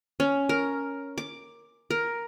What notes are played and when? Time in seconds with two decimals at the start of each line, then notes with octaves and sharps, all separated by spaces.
0.20 C#4
0.49 A#4
1.18 D6
1.91 A#4